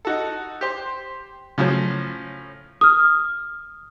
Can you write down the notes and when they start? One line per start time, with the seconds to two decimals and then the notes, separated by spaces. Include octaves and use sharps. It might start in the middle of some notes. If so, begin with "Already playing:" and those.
0.05 D#4 F#4 A4
0.61 G4 C5
1.58 A2 C#3 F3 F#3 C#4
2.81 D#6 F6